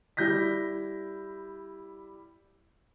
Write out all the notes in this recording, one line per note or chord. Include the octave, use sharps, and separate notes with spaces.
G3 E4 G6 A#6 B6